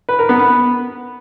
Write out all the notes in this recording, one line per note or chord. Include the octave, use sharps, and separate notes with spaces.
B4
A#4
B3
B3